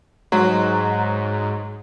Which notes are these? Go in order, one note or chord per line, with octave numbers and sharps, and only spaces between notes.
G#2 F#3